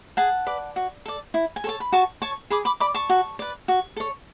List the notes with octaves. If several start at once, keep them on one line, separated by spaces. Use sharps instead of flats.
G#4 F#5 A5
B4 D5
F#4
A4 D5
E4
G#5
A4 C#5 A5
B5
F#4 A5 C#6
C#5 A5 C#6
G#4 B5 D6
B5 D6
D5 B5 D6
A5 C#6
F#4
B4 D5
F#4
A4 C#5